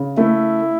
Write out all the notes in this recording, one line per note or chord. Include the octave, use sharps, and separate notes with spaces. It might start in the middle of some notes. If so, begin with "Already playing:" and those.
Already playing: C#3
A3 E4